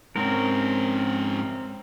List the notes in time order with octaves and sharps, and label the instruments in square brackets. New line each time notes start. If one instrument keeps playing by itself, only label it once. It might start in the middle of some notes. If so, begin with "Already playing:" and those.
[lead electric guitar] G#2 C#4 [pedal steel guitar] C4 A#4